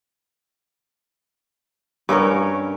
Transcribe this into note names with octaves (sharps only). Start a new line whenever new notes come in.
G2 C#4 A#4 C#5